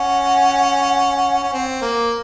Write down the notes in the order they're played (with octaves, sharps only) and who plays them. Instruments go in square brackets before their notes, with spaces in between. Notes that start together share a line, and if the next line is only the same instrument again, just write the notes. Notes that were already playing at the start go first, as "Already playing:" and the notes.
Already playing: [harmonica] C#4 [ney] F#5
[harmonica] C#4
C4
A#3